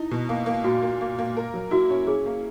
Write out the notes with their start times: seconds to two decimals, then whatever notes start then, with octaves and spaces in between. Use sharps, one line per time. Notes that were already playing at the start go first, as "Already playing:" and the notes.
Already playing: D#4 E4
0.11 B2
0.29 A#3
0.46 A#3
0.64 A#2 F#4
0.82 A#3
1.01 A#3
1.19 A#3
1.37 A#4
1.54 F#3
1.71 E4 F#4
1.90 C#4
2.07 C#4 G#4
2.26 A#3